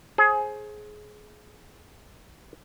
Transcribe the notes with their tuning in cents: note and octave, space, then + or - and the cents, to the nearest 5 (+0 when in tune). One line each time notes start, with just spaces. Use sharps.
G#4 +20 C5 +30